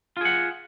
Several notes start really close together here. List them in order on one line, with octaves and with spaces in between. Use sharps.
F4 G#4 F#5